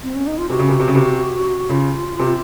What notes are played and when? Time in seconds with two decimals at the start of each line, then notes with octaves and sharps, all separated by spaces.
0.03 C4
0.15 C#4
0.27 D#4
0.38 F4
0.50 C3 F#4
0.59 C#3
0.68 C3
0.80 C3
0.88 C#3
0.95 C3
1.69 C#3 F4
2.19 C3